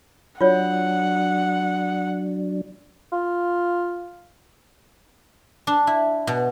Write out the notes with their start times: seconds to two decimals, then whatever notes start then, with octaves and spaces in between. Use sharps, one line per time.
0.41 F#3 D4 F4 C#5 F#5
3.12 F4
5.67 D4
5.87 E4
6.27 B2